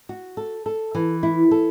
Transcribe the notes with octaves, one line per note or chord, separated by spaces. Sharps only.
F#4
A4
A4
E3
E4
A4